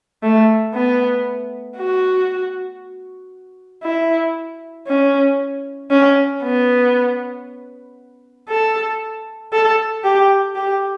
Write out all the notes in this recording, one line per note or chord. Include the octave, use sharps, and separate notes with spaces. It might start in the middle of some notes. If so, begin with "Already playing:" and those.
A3
B3
F#4
E4
C#4
C#4
B3
A4
A4
G4
G4